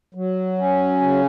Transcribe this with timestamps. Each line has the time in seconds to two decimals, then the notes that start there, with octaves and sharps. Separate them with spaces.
0.15 F#3
0.58 C#4
1.01 C#3